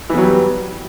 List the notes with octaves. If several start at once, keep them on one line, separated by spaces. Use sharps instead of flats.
E3 F#3 G3 B3